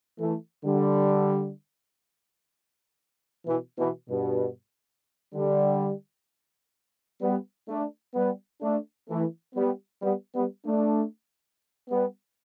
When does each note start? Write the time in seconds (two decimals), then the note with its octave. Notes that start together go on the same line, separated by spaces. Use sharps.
0.18 E3 A3
0.65 D3 G3
3.46 B2 E3
3.77 B2 E3
4.09 G2 B2
5.34 D3 G3
7.21 G3 B3
7.68 A3 D4
8.15 G3 B3
8.61 A3 D4
9.08 E3 A3
9.55 G3 B3
10.02 G3 B3
10.34 G3 B3
10.65 A3 D4
11.89 G3 B3